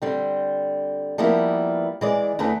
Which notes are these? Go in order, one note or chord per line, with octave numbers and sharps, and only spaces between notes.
D3 G3 C4
F3 G3 A#3 B3 E4
E3 G#3 D5
E2 D3 A3 B4